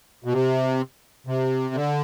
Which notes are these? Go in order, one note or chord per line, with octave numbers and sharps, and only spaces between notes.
B2
C3
C3
D3